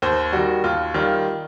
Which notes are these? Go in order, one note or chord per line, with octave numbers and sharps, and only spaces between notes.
D#2 C5
D#3 G3 F#4
D#2 F4
D#3 G3 F4